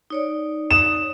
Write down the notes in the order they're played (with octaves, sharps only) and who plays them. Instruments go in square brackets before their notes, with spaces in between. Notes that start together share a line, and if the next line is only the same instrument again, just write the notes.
[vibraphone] D#4 C#5 D5
[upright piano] D#6 E7